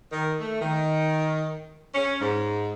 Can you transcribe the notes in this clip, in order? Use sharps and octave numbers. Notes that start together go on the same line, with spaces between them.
D#3
A3
D#3
C#4
G#2